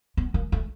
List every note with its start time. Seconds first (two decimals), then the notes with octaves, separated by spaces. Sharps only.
0.17 B3
0.34 A#3
0.52 A3